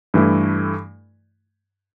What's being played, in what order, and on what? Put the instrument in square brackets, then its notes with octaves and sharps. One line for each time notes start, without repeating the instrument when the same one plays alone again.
[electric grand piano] G2 E3 A3 E4